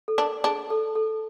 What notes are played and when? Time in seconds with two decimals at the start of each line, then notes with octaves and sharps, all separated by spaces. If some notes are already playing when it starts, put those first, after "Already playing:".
0.08 A4
0.18 D4 A#4
0.44 D4 G#4
0.70 A4
0.95 A4